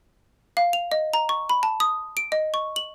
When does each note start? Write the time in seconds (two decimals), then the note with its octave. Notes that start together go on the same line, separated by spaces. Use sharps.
0.57 F5
0.73 F7
0.92 D#5
1.14 A#5
1.29 C#6
1.49 B5
1.63 A5
1.80 D#6
2.17 D7
2.32 D#5
2.54 C#6
2.76 F#7